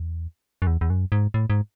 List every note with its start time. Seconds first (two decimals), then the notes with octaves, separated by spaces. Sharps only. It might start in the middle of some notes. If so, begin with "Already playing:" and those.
Already playing: E2
0.62 F#2
0.67 E2
0.81 E2
0.90 F#2
1.12 G#2
1.34 A2
1.50 G#2